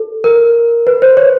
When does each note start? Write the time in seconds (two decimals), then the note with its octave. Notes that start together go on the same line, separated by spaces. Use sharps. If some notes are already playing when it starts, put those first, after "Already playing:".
Already playing: A4
0.24 A#4
0.87 B4
1.02 C5
1.17 C#5